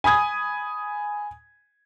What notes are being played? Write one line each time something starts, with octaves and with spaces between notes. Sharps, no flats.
G#5 B5 D#6 G#6